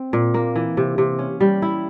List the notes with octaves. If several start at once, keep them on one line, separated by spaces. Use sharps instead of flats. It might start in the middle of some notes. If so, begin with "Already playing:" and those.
Already playing: C4
A#2
A#3
E3
C3
C3
C#4
G3
E4